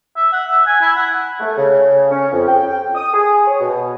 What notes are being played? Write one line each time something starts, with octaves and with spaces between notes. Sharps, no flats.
E5
F#5
E5
G#5
E4
F#5
A3
C#3
C#4
F2
G5
D#6
G#4
C#5
B2